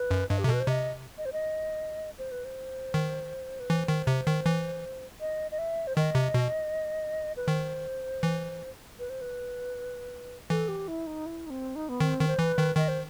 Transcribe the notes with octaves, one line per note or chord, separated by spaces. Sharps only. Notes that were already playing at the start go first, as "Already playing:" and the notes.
Already playing: B4
F#2
G2 D#5
G4
C3 A4
B2 B4
C5
C3 D#5
D#5
C5
D#5
C5
B4
C5
D#3
B4
E3 C5
D#3
C3
D#3
E3
D#5
D#5
E5
C5
D#3 D#5
C3
B2
B4
D#3 C5
E3
B4
C5
B4
E3 A4
G4
E4
D#4
E4
D#4
C4
D#4
B3
D#3 C4
D#3
C5
E3 B4
D#3
D#3 D#5
C5